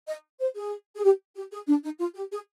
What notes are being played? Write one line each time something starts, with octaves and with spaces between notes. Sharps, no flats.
D#5
C5
G#4
G#4
G4
G4
G#4
D4
D#4
F4
G4
G#4